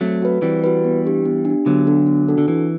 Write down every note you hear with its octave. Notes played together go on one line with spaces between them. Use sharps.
F#3 A3 C4
F#4 B4
E3 G3 C4
F#4 B4
B3
D4 G4
B3
D4 G4
D3 F#3 B3
D4 F#4 A4
B3
D4 F#4 A4
D3
E3 C4